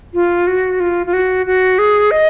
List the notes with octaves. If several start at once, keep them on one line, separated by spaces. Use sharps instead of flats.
F4
F#4
F4
F4
F#4
F#4
G#4
D#5